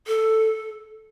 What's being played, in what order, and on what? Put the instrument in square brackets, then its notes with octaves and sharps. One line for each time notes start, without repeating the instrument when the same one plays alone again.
[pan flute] A4